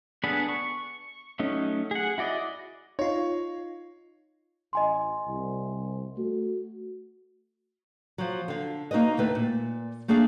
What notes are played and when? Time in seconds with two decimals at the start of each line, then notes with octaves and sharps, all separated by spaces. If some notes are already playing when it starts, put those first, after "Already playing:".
0.24 B3 D4 G#4 A4 B4
0.49 C#6
1.39 F#3 A3 C#4 D#4
1.91 G#4 F#5
2.18 E4 F#4 D5 D#5
2.99 D#4 F4 C#5
4.73 A1 D#5 G#5 C6
5.26 C2
6.17 A3 F#4
8.18 F3 F#3
8.48 D3 F5
8.91 A#3 D#4 F#4 B4 D#5
9.17 D#2 D3 A3 B4
9.35 A#2
10.08 A3 A#3 D4 G#4 E5 F5